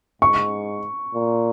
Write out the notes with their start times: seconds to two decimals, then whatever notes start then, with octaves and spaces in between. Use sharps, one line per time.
0.22 G#2 C#6
1.14 A#2